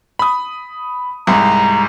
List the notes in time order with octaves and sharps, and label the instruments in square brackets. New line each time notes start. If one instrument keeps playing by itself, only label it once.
[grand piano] B5 D#6
[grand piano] C2 G#2 [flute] A#5